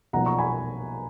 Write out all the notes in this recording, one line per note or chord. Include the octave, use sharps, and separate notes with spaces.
B1 A#2 F3 B3 F#5 A#5
A#5 C#6
G#5 B5